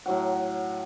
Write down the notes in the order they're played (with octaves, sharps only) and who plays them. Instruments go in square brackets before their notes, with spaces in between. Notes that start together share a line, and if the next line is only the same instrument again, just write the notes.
[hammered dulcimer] A2 F#3 F#5